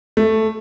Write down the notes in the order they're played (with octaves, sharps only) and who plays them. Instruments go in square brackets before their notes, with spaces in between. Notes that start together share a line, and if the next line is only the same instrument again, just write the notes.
[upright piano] A3